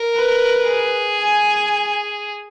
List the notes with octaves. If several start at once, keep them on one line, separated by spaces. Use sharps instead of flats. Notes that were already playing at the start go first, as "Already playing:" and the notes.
Already playing: A#4
B4
G#4
G#5